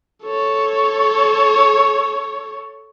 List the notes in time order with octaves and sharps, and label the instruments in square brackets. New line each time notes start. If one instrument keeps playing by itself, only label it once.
[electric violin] A4 C#5